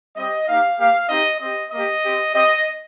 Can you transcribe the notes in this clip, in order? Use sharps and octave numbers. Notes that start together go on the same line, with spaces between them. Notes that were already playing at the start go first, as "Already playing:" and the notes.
G3 C4 G4 D#5
A#3 D#4 G4 F5
A#3 G4 F5
C4 D#4 G4 D#5
C4 G4 D#5
A#3 G4 D#5
C4 G4
C4 G4 D#5